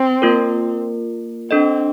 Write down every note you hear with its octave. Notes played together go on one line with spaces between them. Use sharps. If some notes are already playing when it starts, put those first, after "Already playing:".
Already playing: C4
A#3 F4 A#4
C4 D4 A4 D#5